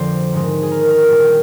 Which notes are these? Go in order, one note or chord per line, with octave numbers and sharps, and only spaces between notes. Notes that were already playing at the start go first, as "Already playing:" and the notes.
Already playing: F2 D3 F3 C5 D5
G#2 D#3 G#3 C4
G#4
A#4
A#4
A#2 G3 D4
G5